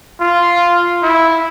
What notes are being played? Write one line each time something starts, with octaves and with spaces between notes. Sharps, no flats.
F4
E4